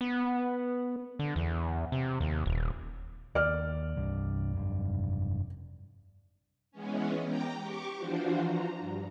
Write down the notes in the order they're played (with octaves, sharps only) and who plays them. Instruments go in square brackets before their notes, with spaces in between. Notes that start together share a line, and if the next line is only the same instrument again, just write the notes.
[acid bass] B3
D3
E2
C3
D#2
D#1
[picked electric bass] D#2 [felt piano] D5 F6
[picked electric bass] C2 G2
F1 G2
[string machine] E3 G#3 B3 C#4
G5 A#5 D6
G4 C#6 D6
E3 F3 D4 F4 F#4 C5
A#5
G2